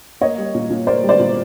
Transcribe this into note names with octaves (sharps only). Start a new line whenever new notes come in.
A#3 C#5 D#5
G3
A#2
A#2
A#3 C5 D5
G3
C5 D5
A#2